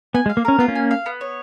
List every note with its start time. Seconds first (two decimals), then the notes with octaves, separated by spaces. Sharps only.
0.14 B3 G#5
0.26 G#3
0.29 F5
0.37 A#3
0.45 C#4 A#4
0.59 B3 F4
0.68 A#3 C#4
0.75 G#5
0.91 F5
1.06 B3
1.21 C#5